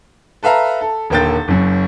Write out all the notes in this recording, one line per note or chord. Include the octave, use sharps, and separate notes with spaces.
A4 B4 E5 F5 A#5
A4
D#1 D3 A#3 G5 G6 A6
F#1 F#2